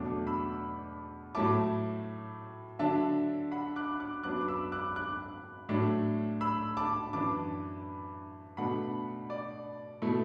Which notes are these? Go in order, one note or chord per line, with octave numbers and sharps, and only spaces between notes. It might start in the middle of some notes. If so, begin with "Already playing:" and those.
Already playing: E2 B2 F#3 A3 D4 D6
B5 E6
A2 F#3 A3 E4 A5 D6
D3 F#3 D4 E5 A5
F#5 B5
D6 F#6
D6 F#6
F#2 F#3 B3 D4 D6 F#6
D6
B5 E6
D6 F#6
D6 F#6
A2 F#3 A3 D4
B5 E6
A5 D6
F#2 E3 D4 A5 D6
B2 A3 D4 F#5 B5
D5
B2 A3 E4